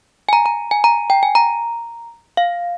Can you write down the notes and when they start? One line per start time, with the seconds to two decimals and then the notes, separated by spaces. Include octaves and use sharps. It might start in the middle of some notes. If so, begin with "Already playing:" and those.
0.29 G#5
0.33 A#5
0.46 A#5
0.71 G#5
0.84 A#5
1.10 G5
1.23 G#5
1.35 A#5
2.37 F5